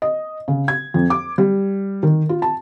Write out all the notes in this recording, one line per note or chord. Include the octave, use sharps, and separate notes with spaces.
D#5
C#3
G#6
F2
D6
G3
D#3
F4
A5